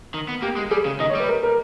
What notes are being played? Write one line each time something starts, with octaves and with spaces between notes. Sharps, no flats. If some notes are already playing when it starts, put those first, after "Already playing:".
D#3
B3
A#3 G4
G#3
G3 G#4
C#3
D#3 D#5
C#5
G3 B4
A#4
A#4